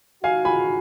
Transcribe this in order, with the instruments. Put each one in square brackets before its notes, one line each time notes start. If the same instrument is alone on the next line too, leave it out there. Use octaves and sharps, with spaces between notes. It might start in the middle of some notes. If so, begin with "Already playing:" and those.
[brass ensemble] D#3 G#3 D#4 F#4 [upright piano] F5 G#5
[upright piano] G#5 B5